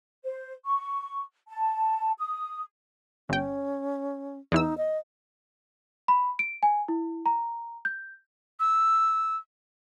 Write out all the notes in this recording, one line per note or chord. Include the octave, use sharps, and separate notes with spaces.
C5
C#6
A5
D#6
G1 C#4 G5
E2 E3 D#4 E6
D#5
B5
D7
G#5
E4
A#5
G6
E6